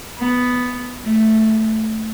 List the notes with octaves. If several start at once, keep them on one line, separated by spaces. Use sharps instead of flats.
B3
A3